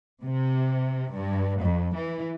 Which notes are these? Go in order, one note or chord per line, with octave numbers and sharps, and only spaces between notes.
C3
G2
F2
E3